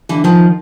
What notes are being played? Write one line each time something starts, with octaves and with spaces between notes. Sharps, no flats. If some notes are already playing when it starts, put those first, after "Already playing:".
D3 E3
D#3 F3